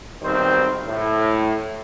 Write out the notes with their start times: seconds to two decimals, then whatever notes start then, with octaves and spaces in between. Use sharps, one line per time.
0.22 B1 D#3 G3 C4 C5
0.86 A2